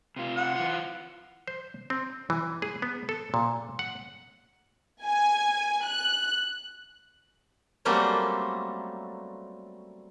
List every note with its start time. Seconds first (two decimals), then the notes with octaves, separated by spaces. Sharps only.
0.16 C3 F4
0.36 F#5
0.56 E3 F4
1.48 C5
1.90 C4
2.30 E3
2.62 G#4
2.82 B3
3.09 A4
3.34 A#2
3.79 F#5
5.03 G#5
5.84 F#6
7.85 F#3 G3 A3 A#3 C4 C#4